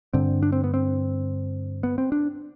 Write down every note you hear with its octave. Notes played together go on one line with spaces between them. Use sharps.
G2 D3 C4
D4
C4
B3
C4
B3
C4
D4